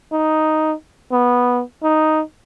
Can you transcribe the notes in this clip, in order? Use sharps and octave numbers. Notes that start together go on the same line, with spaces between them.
D#4
B3
D#4